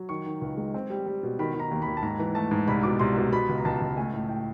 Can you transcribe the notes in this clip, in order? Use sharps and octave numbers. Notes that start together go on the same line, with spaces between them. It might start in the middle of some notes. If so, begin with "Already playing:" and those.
Already playing: F#3
D#3 C#6
D#3
C#2
G#3
C4
G3
G3
B2
D#3 B5
D#3
A#5
D#2
B5
D#2
A5
G#2 A#5
E3
A3 A5
G#2
C2 B5
B2 D6
C2 C6
B2
B2 B5
C#2
A#5
C#2 A5
C#2
A3 G#5
A2
A2 G5